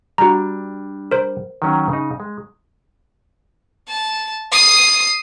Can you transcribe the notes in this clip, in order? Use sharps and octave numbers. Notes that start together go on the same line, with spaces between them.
G3 D4 F#4 A#5
A#4 C5
D#3 F#3 C#4
C#3 D#4
G#3
A5
D#6 C7